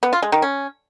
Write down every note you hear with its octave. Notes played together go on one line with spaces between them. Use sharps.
B3
F4
G#3
D#3
C#4